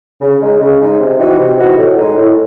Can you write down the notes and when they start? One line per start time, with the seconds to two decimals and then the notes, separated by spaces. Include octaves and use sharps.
0.21 C#3
0.41 G#3 D#4
0.60 C#3
0.80 G#3 D#4
1.00 C3
1.18 E3 C4 D#4 F#4
1.39 C3
1.59 E3 C4 D#4 F#4
1.78 A2
1.98 G#3 D#4
2.17 A2